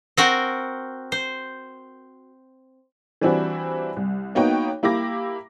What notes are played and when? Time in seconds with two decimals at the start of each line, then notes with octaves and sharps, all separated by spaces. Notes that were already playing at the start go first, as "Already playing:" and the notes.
0.18 C4 F#4 A#4 G5
1.12 C5
3.21 E3 G3 C4 D4 E4 F#4
3.97 C2
4.35 A#3 B3 D#4 F#4 C#5 G5
4.83 A#3 E4 G4 D6 A#6